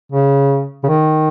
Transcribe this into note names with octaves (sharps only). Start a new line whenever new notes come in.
C#3
C#3
D#3